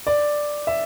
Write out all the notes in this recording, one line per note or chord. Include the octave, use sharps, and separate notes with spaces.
D5
E5